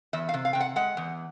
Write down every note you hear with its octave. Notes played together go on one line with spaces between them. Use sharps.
E2 E5
F5
C3
F5
C3 G5
F#5
G#3 F#5
E2